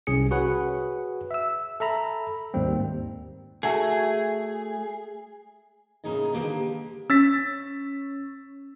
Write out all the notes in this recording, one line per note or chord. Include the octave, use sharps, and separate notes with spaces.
C2 C#4 G#4 C#7
F#4 G#4 B4 C#5 F#5
E5 E6
A4 E5 A#5 B5
D#2 G#2 G3 A#3 C4
A3 F#4 G#4 A4
A2 C#3 A#3 D#4 G#4 D#5
D3 D#3 A#3 G4 B4
C#4 E6 A6 B6